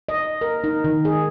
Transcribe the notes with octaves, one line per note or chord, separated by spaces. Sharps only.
D#5
A#4
D#4
D#3
G#4